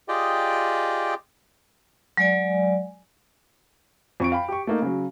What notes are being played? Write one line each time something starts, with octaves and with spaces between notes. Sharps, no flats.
F4 G4 G#4 D5 D#5 G5
F#3 G#3 D5 G#5
F2 C#6 D7
F5 G5 B5
G4 C#6
A3 A#3 D#4
C#3 F#3